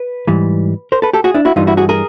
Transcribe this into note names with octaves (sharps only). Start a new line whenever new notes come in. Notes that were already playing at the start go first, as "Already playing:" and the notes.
Already playing: B4
G#2 E3 G3
A#4 C5
A4 B4
G4 A4
F#4 G#4
D4 E4
E4 F#4
G2 E3 G3 D#4 F4
E4 F#4
F#4 G#4
G#4 A#4